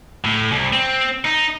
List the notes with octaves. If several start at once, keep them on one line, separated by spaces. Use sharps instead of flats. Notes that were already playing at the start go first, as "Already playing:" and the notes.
A2
C2
C4
D#4